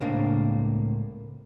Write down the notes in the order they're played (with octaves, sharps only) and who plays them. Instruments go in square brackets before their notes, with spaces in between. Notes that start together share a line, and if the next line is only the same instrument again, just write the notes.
[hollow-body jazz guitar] C#2 A2 A#3 C4 D4 F5